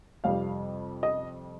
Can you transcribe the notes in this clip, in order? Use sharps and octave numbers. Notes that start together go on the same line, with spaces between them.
F2 C3 G3 F5
D#5